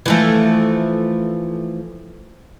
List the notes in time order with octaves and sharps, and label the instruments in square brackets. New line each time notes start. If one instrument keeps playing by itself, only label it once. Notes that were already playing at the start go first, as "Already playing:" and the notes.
[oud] E3 F3 A3